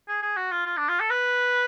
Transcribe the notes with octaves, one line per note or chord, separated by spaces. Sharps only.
G#4
G#4
F#4
F4
F4
D4
F4
A4
B4